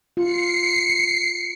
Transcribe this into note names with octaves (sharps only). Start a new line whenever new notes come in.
F4 C7 C#7